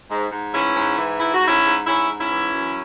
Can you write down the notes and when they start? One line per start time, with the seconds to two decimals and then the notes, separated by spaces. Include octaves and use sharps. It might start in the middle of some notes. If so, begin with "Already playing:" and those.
0.10 G#2
0.31 G#2
0.53 E3 C#4 E4
0.76 G#2
0.98 E3
1.20 G#2 E4
1.34 F#4
1.42 G#2 C#4 E4
1.64 G#2
1.86 G#2 C#4 E4
2.08 G#2
2.19 C#4 E4
2.31 E3
2.53 F#2